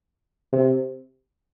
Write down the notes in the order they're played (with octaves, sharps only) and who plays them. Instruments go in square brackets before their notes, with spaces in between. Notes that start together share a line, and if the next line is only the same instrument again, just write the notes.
[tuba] C3